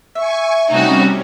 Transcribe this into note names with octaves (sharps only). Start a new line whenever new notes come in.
E5 G#5 C#6
C3 G3 A3 C#4 D#4 F#4